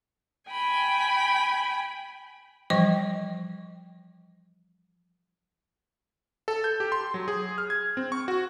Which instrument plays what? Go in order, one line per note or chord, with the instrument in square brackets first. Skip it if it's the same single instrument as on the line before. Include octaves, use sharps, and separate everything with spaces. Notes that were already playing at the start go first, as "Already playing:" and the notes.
[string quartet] G5 G#5 B5
[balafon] E3 F3 G3 D#5 G5 D6
[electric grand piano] A4
G6
G4
C6
F#3
G#4
F6
G#6
C4
C#6
F#4